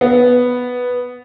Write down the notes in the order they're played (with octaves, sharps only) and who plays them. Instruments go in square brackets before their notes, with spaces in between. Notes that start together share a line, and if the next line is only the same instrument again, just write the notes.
[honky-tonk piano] B3